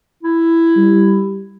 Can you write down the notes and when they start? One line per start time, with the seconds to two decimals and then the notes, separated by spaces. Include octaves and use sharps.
0.23 E4
0.77 G3